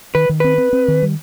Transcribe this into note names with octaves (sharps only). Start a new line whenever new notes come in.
D#3 B4
D#3
C4 B4
C4
C4
D#3
G3